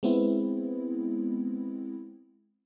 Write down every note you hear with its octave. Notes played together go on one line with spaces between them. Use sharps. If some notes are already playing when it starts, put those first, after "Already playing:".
G#3 B3 C4 E4